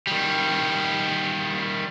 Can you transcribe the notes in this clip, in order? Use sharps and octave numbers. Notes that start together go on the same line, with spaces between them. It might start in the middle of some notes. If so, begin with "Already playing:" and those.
D#3 G3